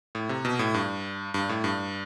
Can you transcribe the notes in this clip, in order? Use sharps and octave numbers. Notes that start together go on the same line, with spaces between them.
A2
C3
B2
A2
G2
G2
A2
G2